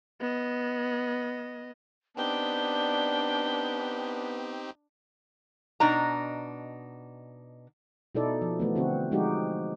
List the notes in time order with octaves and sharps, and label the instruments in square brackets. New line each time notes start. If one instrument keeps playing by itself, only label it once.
[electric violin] B3 D#5
[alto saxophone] B3 [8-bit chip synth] C4 D#4 G4 [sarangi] D4 [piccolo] G5
[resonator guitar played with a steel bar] B2 D4 D#4 A#5
[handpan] B2 D#4 E4 A4 D5
F3
E3 A3 B3
D3 C4 F#4
F3 G#3 D#4 F#4 G4